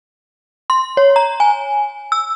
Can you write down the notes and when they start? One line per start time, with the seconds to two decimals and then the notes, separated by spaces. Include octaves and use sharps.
0.70 C6
0.97 C#5
1.16 A#5
1.40 G#5
2.12 E6